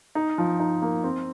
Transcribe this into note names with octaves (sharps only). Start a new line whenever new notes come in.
D#4
F3
D#4
A#3
C4